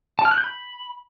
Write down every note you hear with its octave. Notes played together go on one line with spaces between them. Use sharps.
A5
F6
F#6
G6
B5